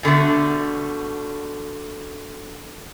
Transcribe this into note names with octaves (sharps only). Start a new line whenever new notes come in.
B2 D3 G3 A3